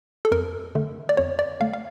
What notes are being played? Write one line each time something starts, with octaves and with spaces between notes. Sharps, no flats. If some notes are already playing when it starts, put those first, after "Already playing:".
A4
F2 A#4
D3 A3
D5
F2 C#5
D5
D3 A3 F5
F5